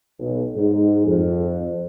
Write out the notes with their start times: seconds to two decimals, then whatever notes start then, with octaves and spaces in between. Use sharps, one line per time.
0.19 B1
0.55 G#2
1.06 F2